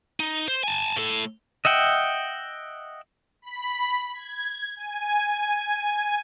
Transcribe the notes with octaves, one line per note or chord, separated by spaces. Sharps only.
D#4
C5
G#5 A5
A2 A4
D#5 E5 F#5 G5
B5
G#6
G#5